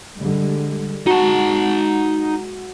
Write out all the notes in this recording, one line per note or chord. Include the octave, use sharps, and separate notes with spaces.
D3 G3 G#3
G#3 D#4 F#4 A5